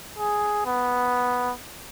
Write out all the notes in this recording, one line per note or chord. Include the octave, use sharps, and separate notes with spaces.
G#4
B3